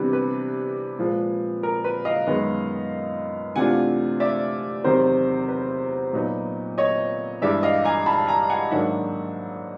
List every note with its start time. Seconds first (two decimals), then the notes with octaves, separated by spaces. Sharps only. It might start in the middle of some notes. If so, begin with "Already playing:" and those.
Already playing: C3 E3 G3 B3 D4 B4
0.13 B4
0.99 A#2 F3 G#3
1.63 A#4
1.84 B4
2.05 D#5 F5
2.27 F#2 D#3 G#3 B3
3.56 C3 E3 A3 D4 F4 F#5 G#5
4.20 D5 E5
4.84 E2 C3 D#3 F#3 A#4 C5
5.48 B4
6.13 A#2 F#3 B3 D#4
6.78 C#5 D#5
7.41 G2 E3 G#3 D5 E5
7.63 D#5 F5
7.85 G#5 A#5
8.06 A5 B5
8.27 G#5 A#5
8.50 F#5 G#5
8.70 G#2 D#3 F#3 A#3 D4 E5 F#5